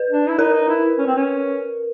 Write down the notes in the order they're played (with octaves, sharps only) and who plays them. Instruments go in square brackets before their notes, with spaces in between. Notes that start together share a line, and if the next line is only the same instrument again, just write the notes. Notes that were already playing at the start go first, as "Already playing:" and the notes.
Already playing: [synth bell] B4
[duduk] D4
E4
[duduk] D#4 [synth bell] A#4
[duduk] D#4
E4
C#4
C4
C#4